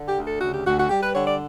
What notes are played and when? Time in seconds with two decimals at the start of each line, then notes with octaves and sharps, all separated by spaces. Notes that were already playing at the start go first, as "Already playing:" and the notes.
Already playing: D3
0.08 G4
0.16 D2
0.24 A4
0.40 C#3 F#4
0.52 G4
0.65 D2 F#4
0.78 F#4
0.89 G3 G4
1.02 B4
1.13 D3 C#5
1.26 D5